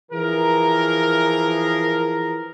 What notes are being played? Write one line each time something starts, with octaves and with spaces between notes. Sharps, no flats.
E3 F3 G#4 A#4